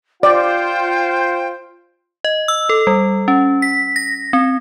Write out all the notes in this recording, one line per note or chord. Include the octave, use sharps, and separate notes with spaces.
F4 C5 D5 G5
D#5
E6
A4
G3
C#4
B6
A#6
C4